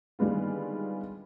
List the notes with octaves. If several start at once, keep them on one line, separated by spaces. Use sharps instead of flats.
D3 D#3 G3 G#3 B3 F4